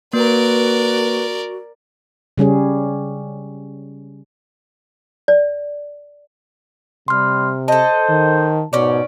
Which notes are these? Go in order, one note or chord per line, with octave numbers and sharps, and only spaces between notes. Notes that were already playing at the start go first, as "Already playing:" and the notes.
A#3 F#4 A#4 B4 D5
C#3 G3 C#4 G#4
D5
C3 G3 C6 F6
A4 C5 D#5 A5
D#3
G#2 B2 C#4 D5